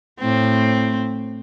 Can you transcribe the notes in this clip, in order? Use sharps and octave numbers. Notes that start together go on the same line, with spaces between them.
A2 C4